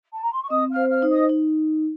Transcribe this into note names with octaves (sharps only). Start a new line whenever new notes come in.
A5
A#5
C6
C#6
C4 D#5 D#6
F5 F6
C5
F5 F6
D#4
D#5 D#6
D#4